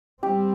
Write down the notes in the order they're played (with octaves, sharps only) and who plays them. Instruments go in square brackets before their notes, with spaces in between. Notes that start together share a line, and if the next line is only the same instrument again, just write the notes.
[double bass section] G3 C4 [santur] G4